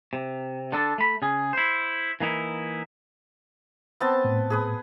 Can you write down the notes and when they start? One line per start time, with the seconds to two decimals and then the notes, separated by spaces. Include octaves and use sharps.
0.13 C3
0.72 D3 D4 A4
0.98 A3 B5
1.22 C#3 G#4
1.53 E4 C5
2.20 E3 A#3 D#4 E4
4.00 B3 C4 A5
4.24 A2
4.50 G#4 B4 D#6